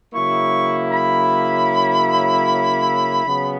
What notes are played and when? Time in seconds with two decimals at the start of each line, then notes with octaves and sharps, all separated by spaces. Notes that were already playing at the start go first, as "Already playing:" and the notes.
0.14 C#3 F#3 A#3 E4 C#6
0.92 B5
3.25 C#3 F#3 B3